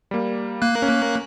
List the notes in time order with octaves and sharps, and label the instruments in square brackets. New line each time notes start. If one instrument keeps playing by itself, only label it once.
[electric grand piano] G3 A#3
[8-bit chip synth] A#3 F#6
[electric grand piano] C#4